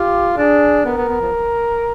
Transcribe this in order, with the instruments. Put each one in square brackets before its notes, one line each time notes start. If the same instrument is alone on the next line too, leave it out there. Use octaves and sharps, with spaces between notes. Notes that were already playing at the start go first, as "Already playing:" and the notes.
Already playing: [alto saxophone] F4 [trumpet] G4
[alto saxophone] D4 [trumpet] G#4
[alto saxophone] B3 [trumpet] A#4
[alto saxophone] B3
B3
F3